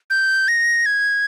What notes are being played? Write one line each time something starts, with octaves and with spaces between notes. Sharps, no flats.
G6
A#6
G#6